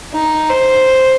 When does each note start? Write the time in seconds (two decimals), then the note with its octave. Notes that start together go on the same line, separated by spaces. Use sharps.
0.13 D#4
0.50 C5